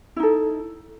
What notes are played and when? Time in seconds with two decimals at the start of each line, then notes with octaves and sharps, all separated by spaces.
0.16 E4
0.20 D#4
0.23 A4